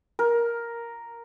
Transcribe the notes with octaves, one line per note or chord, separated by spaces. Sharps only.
A#4